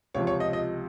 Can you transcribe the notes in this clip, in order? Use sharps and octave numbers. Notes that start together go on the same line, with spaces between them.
C#2 C3 F3 C#5
C#5
D#5
D#5